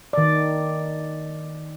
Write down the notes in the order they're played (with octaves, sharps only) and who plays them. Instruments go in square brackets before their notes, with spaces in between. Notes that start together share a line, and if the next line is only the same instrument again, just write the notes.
[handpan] D#3 D5